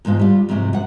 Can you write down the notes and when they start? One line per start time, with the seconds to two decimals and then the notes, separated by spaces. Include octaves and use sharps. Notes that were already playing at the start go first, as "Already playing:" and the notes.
0.05 E2 G#2 B2 F4
0.19 G3 F4
0.49 F2 G#2 C3 F3 F#3
0.73 F#2 F#5